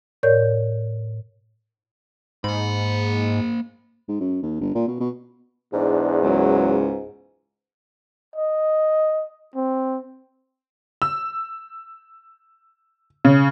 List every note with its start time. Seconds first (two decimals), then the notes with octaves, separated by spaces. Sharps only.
0.23 A2 A#4 C#5 D5 G6
2.44 G#2 A#3 B5
4.08 G#2
4.20 F#2
4.43 D#2
4.61 G1
4.75 A#2
4.88 B2
5.00 B2
5.73 E2 G#2 D4
6.23 C#2 F#3
8.36 D#5
9.56 C4
11.02 E6
13.25 C#3